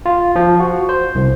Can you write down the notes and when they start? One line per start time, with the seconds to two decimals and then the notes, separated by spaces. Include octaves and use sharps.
0.06 F4
0.36 F3
0.60 F#4
0.89 C5
1.15 C2